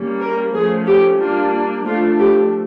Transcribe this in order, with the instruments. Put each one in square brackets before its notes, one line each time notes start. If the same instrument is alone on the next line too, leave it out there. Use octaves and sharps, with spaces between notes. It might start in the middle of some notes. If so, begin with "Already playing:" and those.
Already playing: [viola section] G3 A#3 C#4
A#4
F3 A3 C#4 G#4
G4
G3 A#3 D4 F4
F3 A3 D4 F4
G4